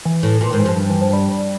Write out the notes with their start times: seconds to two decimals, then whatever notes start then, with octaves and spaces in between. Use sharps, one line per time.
0.05 E3
0.23 A2
0.41 A#2 E3
0.50 G#2 D#3
0.59 E3
0.66 G2 F3
0.90 E3
1.01 F3
1.13 G3